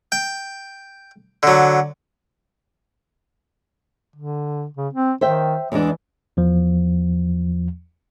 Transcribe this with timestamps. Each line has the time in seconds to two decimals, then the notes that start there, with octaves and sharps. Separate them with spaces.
0.12 G5
1.43 D3 F#3
4.16 D3
4.77 C#3
4.93 C4
5.21 D#3 C5 E5 G5
5.72 E2 E3 G#3 D4
6.37 E2 F3